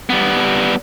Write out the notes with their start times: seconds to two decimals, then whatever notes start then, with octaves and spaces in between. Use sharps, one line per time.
0.09 G3 B3